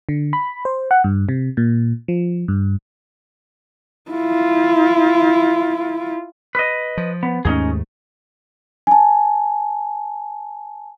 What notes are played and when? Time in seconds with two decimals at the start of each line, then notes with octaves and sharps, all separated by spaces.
0.09 D3
0.33 B5
0.65 C5
0.91 F#5
1.04 G2
1.29 C3
1.57 A#2
2.08 F3
2.48 G2
4.11 E4 F4
6.55 B4 D#5
6.97 F3
7.23 B3
7.45 D#2 G#2 A3 C#4 D#4 G#4
8.87 G#5 A5